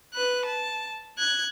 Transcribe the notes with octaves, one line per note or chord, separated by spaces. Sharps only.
B4 F#6
A5
F#6 G#6